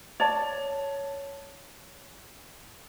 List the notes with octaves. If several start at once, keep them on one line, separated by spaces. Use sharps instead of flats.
C#5 D5 A5